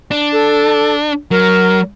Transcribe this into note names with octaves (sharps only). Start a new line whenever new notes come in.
D4
A4
F#3 A#4